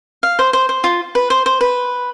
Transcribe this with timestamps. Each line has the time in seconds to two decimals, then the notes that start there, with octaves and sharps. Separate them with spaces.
0.23 F5
0.39 C5
0.53 C5
0.69 C5
0.84 F4
1.15 B4
1.30 C5
1.46 C5
1.61 B4